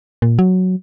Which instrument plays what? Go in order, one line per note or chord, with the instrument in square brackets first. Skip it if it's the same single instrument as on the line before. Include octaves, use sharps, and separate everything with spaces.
[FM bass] A#2
F#3